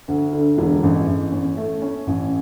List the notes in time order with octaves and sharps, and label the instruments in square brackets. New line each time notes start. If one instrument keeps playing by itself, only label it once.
[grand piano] D2
D3
E1
A1
A1
C#4
A3
C#4
A1